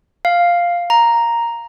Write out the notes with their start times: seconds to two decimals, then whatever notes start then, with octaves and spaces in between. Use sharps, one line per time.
0.25 F5
0.90 A#5